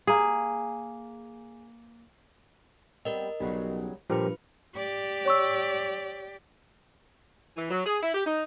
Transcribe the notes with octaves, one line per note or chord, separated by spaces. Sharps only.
A#3 G#4
G3 B3 C4 A#4 D#5
B1 C#3 F#3 G3
G2 A#2 F3 F4 G4 A#4 B4
G4 D5
C#5 C#6 E6
E3
F#3
G#4
E4
G4
D#4